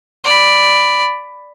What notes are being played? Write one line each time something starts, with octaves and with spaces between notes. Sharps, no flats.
D5 B5